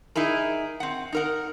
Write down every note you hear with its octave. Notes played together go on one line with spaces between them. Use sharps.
D#4 E4 G#4 A#4
C4 F#5
D#4 A#4 F#5